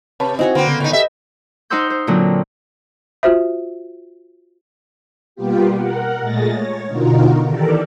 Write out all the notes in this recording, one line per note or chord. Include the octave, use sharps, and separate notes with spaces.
C3 B4 C#5 A5
C4 D#4 E4 F#4 C#5 D#5 G#5
D3 A#3 C4 B4 G5
C#3 B3
A2 D#4
G4 A4 D#5 E5
D#4 C5 F#5 C6 E6 G6
C5
A#2 D3 F#3 A#3 C4
F4 F#4 C5 E5
B2 G3 A#3 B3 F4 G4
A#4 F#5
A#2 G#3 A3 G#4 A6 A#6
C#5
B2 D3 D#4 F4 F#4 A#4
D#3 E3 G4 A4 A#4 D5